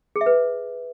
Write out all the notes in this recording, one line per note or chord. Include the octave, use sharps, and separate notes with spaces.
G#4
E5
B4